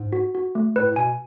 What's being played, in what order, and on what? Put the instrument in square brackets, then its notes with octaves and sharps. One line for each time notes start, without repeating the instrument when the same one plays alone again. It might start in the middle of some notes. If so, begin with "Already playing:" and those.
Already playing: [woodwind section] G#2
[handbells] F#4
F#4
A3
[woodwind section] A2 [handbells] B4
[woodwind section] A2
[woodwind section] B2 [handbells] G#5